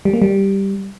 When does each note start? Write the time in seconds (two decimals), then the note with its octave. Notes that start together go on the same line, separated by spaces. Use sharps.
0.05 G3
0.13 A#3
0.22 G3